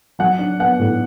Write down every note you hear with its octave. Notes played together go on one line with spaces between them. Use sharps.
F#3 F#5
D4
B3 F#5
A2